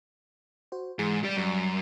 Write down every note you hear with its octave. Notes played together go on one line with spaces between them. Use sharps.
F#4 C5
G#2 E3 G#4 G#5
G3 G4 D5
F#2 G3 D5